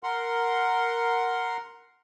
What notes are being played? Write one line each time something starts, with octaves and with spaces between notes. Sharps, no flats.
A#4 F#5 C6